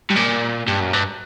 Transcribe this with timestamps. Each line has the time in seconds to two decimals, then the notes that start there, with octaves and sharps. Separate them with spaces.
0.10 G2
0.16 A#2
0.67 G2
0.80 F#2
0.93 G2